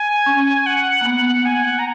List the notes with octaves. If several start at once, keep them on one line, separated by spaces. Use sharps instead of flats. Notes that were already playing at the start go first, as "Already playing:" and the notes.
Already playing: G#5
C#4
F#5
A#3
B3
G#5
F#5
A#5